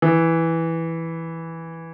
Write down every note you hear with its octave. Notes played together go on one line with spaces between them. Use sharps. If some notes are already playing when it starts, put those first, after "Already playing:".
E3